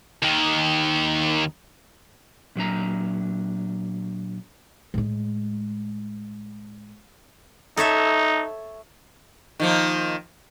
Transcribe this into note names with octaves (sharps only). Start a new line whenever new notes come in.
D#2 D#3
A#2 F#3 D4 A#5
A2 G#3
D#4 A4 C#5 E5
D#3 F3 A#3